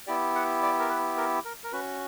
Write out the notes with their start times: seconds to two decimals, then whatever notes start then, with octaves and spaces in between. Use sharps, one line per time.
0.07 B3 E4 G4 D5
0.35 F#5
0.63 D5
0.79 A#4
0.89 B4
1.17 A#4
1.45 A#4
1.64 A#4
1.72 C#4 F#4 B4